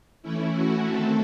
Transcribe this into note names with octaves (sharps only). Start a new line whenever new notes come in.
E3 A3 C#4 E4
F#4
D#3 A3 C4 A4